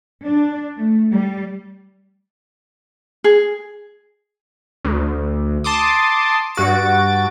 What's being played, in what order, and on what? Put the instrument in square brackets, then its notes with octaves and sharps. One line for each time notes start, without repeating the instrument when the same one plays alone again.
[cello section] D4
A3
G3
[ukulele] G#4
[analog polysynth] D2
A5 C6 D6 D#6
G2 F#4 A6 D7